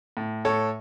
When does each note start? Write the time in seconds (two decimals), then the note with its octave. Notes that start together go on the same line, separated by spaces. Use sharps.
0.17 A2
0.45 A2 A4 C#5